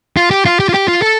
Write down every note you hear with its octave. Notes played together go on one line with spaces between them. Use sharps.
F4
G4
F4
G4
F4
G4
F4
A4